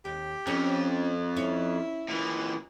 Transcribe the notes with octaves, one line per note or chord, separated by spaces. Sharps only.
D#2 G4
F2 C#4
C#4 E4
A#2 E3